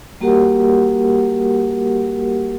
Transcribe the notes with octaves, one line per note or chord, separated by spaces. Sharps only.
G3 A#3 F#4 G4 A#4 F#5